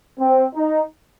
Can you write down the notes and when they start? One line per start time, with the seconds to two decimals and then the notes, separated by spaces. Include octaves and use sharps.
0.19 C4
0.55 D#4